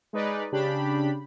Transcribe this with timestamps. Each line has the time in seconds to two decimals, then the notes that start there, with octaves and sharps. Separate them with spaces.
0.13 G#3 D#4 B4 D5
0.52 C#3 D4 G4 B5